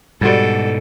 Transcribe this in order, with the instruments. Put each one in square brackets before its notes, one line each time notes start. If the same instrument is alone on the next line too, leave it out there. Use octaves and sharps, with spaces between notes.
[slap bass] G#2 B2 [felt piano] G3 F#4 D5 [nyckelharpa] A4